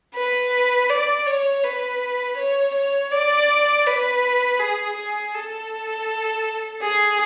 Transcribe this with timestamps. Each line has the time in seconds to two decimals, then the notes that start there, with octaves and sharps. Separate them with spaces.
0.15 B4
0.89 D5
1.26 C#5
1.63 B4
2.38 C#5
2.75 C#5
3.11 D5
3.86 B4
4.60 G#4
4.97 G#4
5.34 A4
6.82 G#4